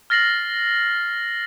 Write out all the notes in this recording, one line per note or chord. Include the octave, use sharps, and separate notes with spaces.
F6 A6 A#6 C7 F#7